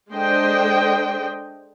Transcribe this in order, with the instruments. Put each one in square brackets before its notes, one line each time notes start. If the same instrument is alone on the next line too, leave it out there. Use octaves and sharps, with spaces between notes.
[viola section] G#3 D4 A4 C5 D#5 G5